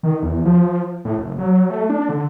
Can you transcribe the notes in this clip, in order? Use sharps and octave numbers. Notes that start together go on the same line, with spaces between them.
D#3
E2
F3
A2
F#1
F#3
A3
D4
D3